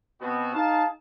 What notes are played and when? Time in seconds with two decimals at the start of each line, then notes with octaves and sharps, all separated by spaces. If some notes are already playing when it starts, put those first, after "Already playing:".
0.21 B2 B3 C4 F#4
0.53 D#4 G#4 F5 A5